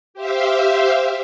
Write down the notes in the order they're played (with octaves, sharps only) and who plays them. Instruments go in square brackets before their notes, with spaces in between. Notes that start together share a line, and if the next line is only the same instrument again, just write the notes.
[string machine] G4 C5 E5 F5